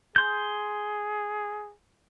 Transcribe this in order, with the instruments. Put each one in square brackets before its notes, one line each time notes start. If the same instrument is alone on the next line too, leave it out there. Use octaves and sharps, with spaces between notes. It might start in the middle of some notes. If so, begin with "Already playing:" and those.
[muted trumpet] G#4 [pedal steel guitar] C6 G6